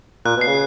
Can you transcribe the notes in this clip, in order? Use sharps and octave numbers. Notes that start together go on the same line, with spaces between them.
A#2 F#6
B2
C7
C#3